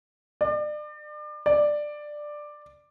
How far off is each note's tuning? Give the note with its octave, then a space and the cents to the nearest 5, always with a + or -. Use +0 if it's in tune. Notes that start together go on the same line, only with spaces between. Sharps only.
D5 +35
D5 +10